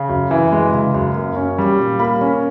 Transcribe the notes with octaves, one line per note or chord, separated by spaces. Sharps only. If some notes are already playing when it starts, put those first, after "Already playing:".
Already playing: C#3
F#2
E3
G#3
C#3
F#2
A#3
C#4
G3
A#2
A#3 B5
C#4